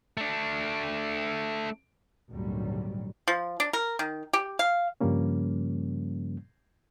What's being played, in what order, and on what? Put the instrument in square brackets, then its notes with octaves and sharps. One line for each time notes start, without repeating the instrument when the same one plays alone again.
[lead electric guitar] A3 D4
[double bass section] G#1 D2 A#2 F#3 G3
[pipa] F3
D4
A#4
D#3
G4
F5
[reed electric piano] G2 C#3 F3 G3 A#3 C#4